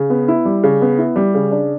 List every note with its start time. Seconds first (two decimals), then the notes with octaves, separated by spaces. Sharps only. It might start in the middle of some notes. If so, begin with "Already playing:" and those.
Already playing: C#3
0.10 B3
0.28 E4
0.45 G3
0.63 C#3
0.81 B3
0.98 E4
1.16 G3
1.34 C#3
1.51 D4